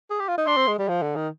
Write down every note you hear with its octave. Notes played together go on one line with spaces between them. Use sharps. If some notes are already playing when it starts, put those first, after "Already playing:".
G#4
G4
F4
D#4
D4 C6
C4
G#3
G3
F3
D3
D#3